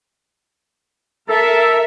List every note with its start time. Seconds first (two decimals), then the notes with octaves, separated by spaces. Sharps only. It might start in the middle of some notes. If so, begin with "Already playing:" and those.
1.28 A4 A#4 E5